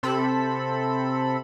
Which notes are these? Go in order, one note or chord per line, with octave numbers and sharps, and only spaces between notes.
C3 C4 A4 B5